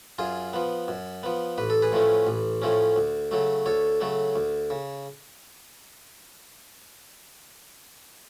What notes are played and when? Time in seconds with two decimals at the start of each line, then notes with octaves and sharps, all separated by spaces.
0.18 F#2 F4 G#4
0.53 F3 B3
0.88 F#2
1.23 F3 B3
1.58 A1 B4
1.70 A4
1.82 G#4 B4
1.92 A2 F3 A3 C#4
2.27 A1
2.62 A2 F3 A3 C#4
2.96 D2
3.31 C#3 F#3 A3
3.66 D2 A4 C#5
4.01 C#3 F#3 A3
4.36 D2
4.70 C#3